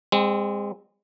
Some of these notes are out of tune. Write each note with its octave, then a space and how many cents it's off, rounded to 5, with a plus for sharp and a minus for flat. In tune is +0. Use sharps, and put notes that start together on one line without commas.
G#3 -35 C4 +0